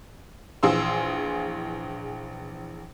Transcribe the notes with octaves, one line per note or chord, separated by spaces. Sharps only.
A#1 E3 G#4 F5 C6 E6